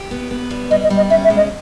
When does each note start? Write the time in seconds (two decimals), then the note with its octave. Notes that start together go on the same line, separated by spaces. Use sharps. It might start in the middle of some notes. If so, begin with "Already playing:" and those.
Already playing: G4
0.11 B3
0.31 B3
0.50 G3
0.71 G3 D#5
0.83 D#5
0.90 G3
0.97 D#5
1.10 C#4 E5
1.24 E5
1.30 G#3
1.37 D#5